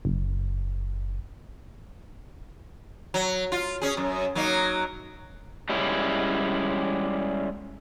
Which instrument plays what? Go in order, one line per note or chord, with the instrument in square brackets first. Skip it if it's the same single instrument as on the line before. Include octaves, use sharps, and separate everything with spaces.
[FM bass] F#1
[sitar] F#3
F4
C#4 G#4
F#2
F#3 A#3 D#4
[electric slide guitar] G3 G#3 C#4 E4